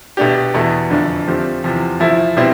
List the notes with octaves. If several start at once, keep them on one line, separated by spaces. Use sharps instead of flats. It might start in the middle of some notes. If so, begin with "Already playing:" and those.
B2 A3 D4 G4
E2 B2 A3
F2 D3 A3 D4
F3 A3 C4 G4
E2 C3 F3
F3 A3 E4
B2 G3 C4 E4